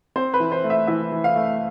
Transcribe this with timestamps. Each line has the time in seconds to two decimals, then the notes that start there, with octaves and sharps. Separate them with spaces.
0.16 C4 C5
0.34 B4
0.40 E3
0.52 C5
0.64 A3
0.70 E5
0.87 E3 E5
1.12 E3
1.24 F5
1.36 A3